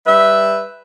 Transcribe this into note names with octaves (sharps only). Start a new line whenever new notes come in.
G3 B4 E5